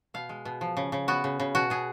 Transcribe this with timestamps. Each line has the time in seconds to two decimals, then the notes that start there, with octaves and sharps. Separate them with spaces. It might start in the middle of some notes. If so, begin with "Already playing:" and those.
0.14 B2 F5
0.29 G#3
0.45 B2
0.61 F3
0.77 C#3
0.92 C#3
1.08 B3 F#4
1.24 C#3
1.40 C#3
1.55 B2 F#4
1.70 B2 G#4